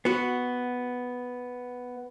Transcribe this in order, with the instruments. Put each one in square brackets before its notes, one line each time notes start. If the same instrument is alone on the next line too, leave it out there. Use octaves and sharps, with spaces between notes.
[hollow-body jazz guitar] B3 F#4